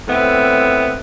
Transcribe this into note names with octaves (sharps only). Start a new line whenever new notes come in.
A2 B3 C4 E5